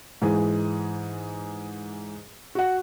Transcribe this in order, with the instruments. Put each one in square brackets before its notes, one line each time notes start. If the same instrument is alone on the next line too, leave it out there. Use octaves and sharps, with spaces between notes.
[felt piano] G#2 E3 G#4
F#4 F#5